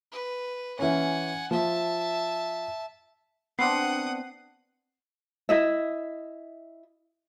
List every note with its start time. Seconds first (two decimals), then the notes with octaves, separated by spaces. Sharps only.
0.12 B4
0.79 E3 C#4 F#5 G#5
1.51 F3 E5 A5
3.59 B3 C4 D4 F#5 D#6 C7
5.49 E4 D#5 E5